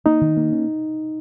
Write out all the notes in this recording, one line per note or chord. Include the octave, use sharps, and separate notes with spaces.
A#3 D#4
D#3
A#3
C#4